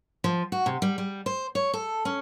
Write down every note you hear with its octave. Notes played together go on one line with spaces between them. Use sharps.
F3
F#4
C3
G3
G3
C5
C#5
A4
C#4